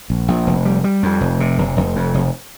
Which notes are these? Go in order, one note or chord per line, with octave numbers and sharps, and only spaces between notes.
A#1
A#1
F1
G3
G3
F2
F1
C3
F1
F1
F2
F1